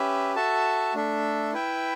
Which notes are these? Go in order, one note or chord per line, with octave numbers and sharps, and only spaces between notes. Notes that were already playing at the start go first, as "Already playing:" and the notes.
Already playing: C#4 G4 B4 E5
F#4 A4 E5 A5
A3 D4 A4 E5
E4 B4 E5 G5